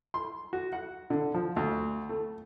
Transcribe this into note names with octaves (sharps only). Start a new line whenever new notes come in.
C6
F#4
F#5
D3
F3
D2
A3